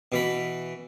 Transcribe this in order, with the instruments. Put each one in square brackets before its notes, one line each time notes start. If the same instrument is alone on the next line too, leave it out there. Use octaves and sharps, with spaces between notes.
[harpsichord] B2 E3 B5